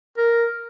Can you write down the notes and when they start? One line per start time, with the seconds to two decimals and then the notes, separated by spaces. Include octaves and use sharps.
0.18 A#4